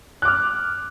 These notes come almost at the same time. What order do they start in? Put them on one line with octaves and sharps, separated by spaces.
F#6 D6 F6